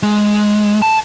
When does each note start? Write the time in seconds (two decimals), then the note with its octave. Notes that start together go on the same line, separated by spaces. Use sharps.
0.03 G#3
0.82 A5